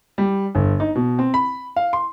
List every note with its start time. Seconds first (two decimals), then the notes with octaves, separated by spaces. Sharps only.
0.18 G3
0.55 G1
0.80 D#4
0.96 B2
1.19 C4
1.34 B5
1.76 F5
1.93 C6